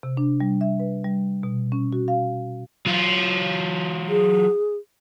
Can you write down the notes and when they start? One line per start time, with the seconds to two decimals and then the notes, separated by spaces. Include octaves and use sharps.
0.03 C3
0.17 D4
0.41 G3
0.61 E5
0.80 B4
1.04 G3
1.43 B2
1.72 C#4
1.93 F#4
2.08 F5
2.86 F#3 F4
4.09 G#4